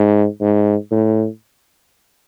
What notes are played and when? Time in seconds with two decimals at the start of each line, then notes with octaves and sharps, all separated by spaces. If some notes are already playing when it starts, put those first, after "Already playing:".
Already playing: G#2
0.41 G#2
0.91 A2